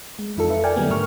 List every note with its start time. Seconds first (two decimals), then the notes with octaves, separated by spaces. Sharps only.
0.19 G#3
0.37 F2 E3 D#4 F4 A4 C#7
0.50 B4 E5
0.63 A4 A#4 D5 G5 G#5 F6
0.76 D3 F#3 G3 A3 B3
0.90 G#2 C#3 A#4 C#6 F6